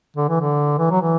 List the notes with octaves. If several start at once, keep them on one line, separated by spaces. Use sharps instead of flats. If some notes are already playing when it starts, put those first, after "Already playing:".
D3
E3
D3
E3
F#3
E3